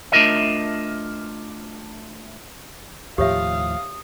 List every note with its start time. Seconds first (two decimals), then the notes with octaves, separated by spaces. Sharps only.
0.12 A3 D4 F4 A#4 D#5 E5
3.18 D#2 A2 F3 G4 C#5 E5 F5 D#6